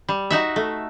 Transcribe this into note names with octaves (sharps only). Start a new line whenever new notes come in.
G3
D#4 F#4 E5
A3